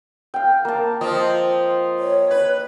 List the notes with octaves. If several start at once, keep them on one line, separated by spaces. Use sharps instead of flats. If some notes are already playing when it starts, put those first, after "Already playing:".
F5 G5
A#3 A5
F3 C4 F4 D#5
C#5
B4